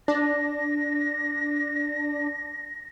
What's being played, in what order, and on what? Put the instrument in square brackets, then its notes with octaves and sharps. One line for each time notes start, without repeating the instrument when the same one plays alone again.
[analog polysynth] D4 [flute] A#6